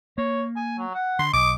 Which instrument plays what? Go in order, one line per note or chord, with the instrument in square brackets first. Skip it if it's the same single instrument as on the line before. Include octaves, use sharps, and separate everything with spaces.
[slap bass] A#3 [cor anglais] C#5
[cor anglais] G#5
F#3
F#5
[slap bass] D3 [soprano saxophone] C6
[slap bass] B1 [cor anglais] D#5 [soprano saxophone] D6